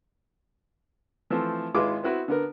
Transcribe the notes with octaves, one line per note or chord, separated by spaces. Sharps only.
E3 F3 A3 C4
G#1 G#3 E4 F4 B4 D6
B3 C4 E4 F#4 B4
D3 B3 A#4